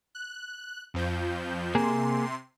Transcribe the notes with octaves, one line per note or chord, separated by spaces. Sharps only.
F#6
F2 F3 G6
C3 A#3 G#4 C6